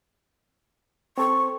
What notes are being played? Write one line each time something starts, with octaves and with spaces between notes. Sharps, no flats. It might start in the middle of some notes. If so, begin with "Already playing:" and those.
C4 A4 C5 C#6